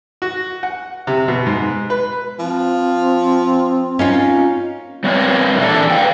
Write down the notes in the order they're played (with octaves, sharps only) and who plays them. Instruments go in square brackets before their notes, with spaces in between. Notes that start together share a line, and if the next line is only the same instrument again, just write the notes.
[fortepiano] F#4
F#5
C3
B2
G#2
B4
[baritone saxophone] F3 [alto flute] C4
[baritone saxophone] A#3 [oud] C#4 D#4 F4
[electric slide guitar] F#3 A3 A#3 C4 B4 C#5
A#2 E3 D4 E4 A4
B4 F5 G5